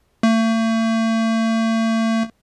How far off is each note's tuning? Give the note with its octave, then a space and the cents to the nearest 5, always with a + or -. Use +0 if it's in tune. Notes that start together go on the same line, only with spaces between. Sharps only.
A3 +40